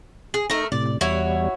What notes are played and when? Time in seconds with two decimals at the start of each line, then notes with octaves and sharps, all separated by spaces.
0.34 G#4
0.50 A3 D#4 A#4
0.72 A2 C3 D5
1.01 E2 G3 E4 F#4 C#5